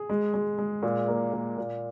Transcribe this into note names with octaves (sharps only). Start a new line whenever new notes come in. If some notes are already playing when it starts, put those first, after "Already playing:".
Already playing: G#4
G#3
G#3
G#3
A#2
A#3
A#2
A#2